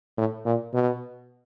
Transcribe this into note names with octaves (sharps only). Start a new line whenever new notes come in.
A2
A#2
B2